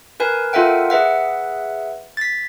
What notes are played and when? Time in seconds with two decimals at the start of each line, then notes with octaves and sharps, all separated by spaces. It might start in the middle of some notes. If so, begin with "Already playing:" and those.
0.20 A#4 B4 G#5
0.53 F4 A4 A#4 E5 F#5 G5
0.90 G#4 B4 E5 F#5
2.17 A6 B6